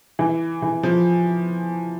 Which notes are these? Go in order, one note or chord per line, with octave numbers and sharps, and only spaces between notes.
E3
E3
F3